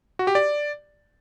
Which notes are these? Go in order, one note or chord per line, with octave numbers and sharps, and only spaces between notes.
F#4
G4
D5